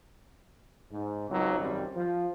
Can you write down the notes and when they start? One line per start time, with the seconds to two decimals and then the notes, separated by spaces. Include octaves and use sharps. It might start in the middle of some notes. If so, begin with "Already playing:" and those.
0.91 G#2
1.30 C#2 F#3 C4 D#4
1.60 G#1 F#2 G3 C4
1.96 F3